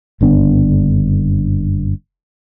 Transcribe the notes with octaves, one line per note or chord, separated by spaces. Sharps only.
F#1 G2 D3 B3